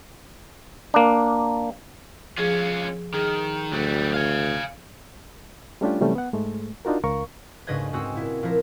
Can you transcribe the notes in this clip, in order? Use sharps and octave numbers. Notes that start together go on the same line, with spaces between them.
A#3 D4
F3 C#4 F4 G#4
D#3 G#4
D2 F#3 G3
F5 G#5
G3 A3 C#4 D4 F4 G4
C3 E3 F#3 G3 A3 C#4
B3 F#5
G#2 G#3 A3
D4 D#4 F4 F#4 A#4
C#2 A#4 F5 C#6
D2 G#2 C#3 B4 D#5 G#6
G#2 G#3 C4 F#4 G#4 E6
A#2 E4
A#2 F3 E4 A#4